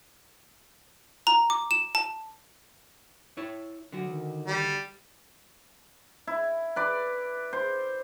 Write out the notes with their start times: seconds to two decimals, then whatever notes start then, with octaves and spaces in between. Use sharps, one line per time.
1.27 A#5
1.50 D6
1.71 E7
1.95 A5
3.37 E4 C#5
3.92 D3 F#3 F#4
4.09 D#3
4.46 G3
6.27 E4
6.76 B4 D5
7.53 C5